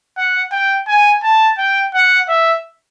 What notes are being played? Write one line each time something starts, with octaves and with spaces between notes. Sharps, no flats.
F#5
G5
G#5
A5
G5
F#5
E5